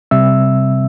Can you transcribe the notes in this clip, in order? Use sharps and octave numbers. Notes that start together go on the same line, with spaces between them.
C3 G3 C4 E5 E6